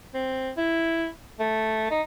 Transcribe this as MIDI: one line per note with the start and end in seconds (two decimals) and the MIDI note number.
0.14 0.50 60
0.57 1.07 64
1.40 1.88 57
1.91 2.02 63